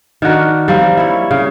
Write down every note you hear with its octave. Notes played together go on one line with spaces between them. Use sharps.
D#3 D4 F#4 A#4
G3 A#3 C4
E4 C#5
C#3